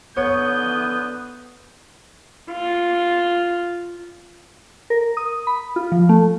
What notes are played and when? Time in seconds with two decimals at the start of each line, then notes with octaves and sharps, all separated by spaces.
0.17 D3 B3 C#5 D#6 G6
2.51 F4
4.90 A#4
5.17 D#6
5.47 B5
5.76 F4
5.92 F3
6.09 A3